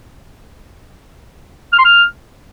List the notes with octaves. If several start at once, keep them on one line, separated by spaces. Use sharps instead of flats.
F6
C6
F6